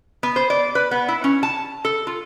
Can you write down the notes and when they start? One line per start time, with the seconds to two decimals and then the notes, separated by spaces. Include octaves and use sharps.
0.23 B3
0.36 C5
0.50 D5
0.75 B4
0.91 B3
1.08 E4
1.24 C#4
1.43 A5
1.85 A4
2.07 F4